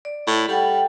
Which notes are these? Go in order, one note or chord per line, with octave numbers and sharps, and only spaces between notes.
D5
A2
G3 A4 F#5 G5